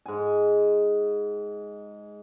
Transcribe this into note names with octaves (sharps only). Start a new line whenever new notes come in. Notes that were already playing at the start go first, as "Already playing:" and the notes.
G#2 G#5